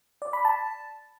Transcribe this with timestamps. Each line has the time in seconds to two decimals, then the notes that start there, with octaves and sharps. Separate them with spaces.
0.22 D5
0.33 B5
0.45 A5